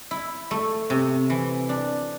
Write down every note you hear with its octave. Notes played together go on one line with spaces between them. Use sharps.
E4
A3
C3
E3
D4